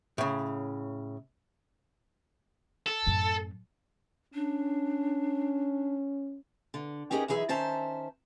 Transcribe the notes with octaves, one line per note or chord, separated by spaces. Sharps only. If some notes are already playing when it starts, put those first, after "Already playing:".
A2 C#3
A4
F#2 A2
C#4 D4
D3
C#4 D#4 G4 G#4 A#4 D#5
F#2 E3 D#4 G#4 E5
D#3 C#4 C5 E5 A5 A#5